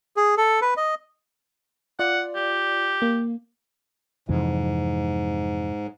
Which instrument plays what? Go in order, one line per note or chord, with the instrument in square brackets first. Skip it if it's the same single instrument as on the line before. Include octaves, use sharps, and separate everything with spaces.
[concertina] G#4
A4
B4
D#5
[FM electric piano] F4 D5 [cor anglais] F#5
[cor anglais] G4
[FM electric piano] A#3
[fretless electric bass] F2 C3 E3 [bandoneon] G#2